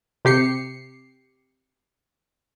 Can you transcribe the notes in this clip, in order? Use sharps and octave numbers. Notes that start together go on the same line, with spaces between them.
C3 G4 C7 C#7